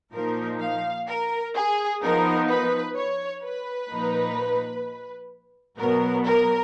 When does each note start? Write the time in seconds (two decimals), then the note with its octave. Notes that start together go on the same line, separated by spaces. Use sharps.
0.13 A#2 F3 A#3 D#4 A#4
0.60 F5
1.08 A#4
1.55 G#4
2.02 F3 B3 D#4 A#4
2.49 B4
2.96 C#5
3.43 B4
3.91 A#2 F3 A#3 D#4
5.79 B2 F#3 B3 A#4
6.26 A#4